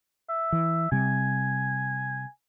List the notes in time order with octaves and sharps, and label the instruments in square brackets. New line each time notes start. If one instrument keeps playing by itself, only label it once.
[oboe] E5
[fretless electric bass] E3
[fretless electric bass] C3 G3 [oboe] G#5